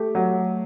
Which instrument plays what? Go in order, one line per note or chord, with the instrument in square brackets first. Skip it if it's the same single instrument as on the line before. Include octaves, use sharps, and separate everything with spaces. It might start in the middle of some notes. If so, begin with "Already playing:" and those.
Already playing: [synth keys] A3 [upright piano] G4
[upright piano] F#3